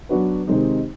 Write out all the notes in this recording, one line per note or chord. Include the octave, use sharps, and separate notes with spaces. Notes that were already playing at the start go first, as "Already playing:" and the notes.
F#3 B3 D4 F#4 B4
C3 D#3 G#3 C4 D#4